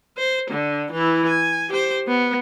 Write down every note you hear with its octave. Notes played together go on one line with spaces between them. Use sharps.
C5
D3
E3 E4
G#5
G4 C5
B3